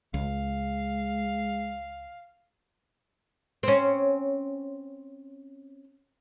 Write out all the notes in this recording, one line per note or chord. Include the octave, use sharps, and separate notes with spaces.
C#2 G#3 F5
C4 C#4